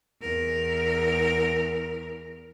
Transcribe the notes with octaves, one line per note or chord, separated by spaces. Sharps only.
E2 A#4